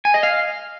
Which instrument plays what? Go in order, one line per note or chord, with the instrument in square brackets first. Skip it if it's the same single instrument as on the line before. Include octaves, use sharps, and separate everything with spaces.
[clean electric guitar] G#5
D#5
F5